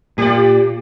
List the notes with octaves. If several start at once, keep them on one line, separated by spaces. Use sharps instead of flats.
A#2 G4 D5